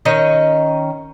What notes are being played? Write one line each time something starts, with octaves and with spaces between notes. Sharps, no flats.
D#3 C#4 D#5